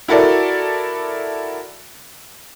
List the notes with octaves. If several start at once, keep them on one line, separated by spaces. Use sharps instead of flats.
E4 F#4 A4 A#4 D5